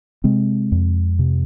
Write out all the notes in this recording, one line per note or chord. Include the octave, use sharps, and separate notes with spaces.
C3 G#3 C4
F2
C3